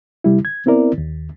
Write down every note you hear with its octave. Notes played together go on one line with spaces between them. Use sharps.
C3 G3 E4
G#6
B3 C4 E4 A#4 D5
D#2